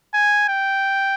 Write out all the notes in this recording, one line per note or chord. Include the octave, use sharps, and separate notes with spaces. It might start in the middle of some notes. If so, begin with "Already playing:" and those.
G#5
G5